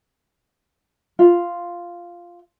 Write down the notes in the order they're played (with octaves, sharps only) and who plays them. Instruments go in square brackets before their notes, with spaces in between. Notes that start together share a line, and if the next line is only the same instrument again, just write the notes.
[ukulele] F4